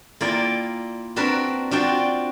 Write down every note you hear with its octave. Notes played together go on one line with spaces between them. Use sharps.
A#3 E4 F4 D5 G5 G#5
C4 D4 F#4 A#4 B4 A5
D4 F4 F#4 C5 D5 G5